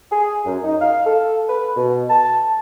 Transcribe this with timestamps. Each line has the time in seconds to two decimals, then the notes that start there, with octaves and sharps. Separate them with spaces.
0.12 G#4
0.45 F#2
0.64 D#4
0.81 F5
1.05 A4
1.49 B4
1.77 B2
2.10 A5